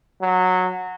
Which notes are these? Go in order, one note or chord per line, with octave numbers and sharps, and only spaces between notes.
F#3